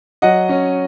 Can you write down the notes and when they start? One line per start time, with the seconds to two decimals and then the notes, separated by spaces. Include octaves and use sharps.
0.22 F#3 D#5 F#5
0.49 C#4